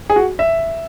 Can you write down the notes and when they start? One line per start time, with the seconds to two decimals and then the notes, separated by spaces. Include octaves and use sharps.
0.10 G#4
0.16 F#4
0.39 E5